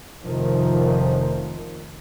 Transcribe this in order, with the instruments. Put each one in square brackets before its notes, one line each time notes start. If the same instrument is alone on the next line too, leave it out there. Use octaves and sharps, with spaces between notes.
[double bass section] F1 C3 D#3 F3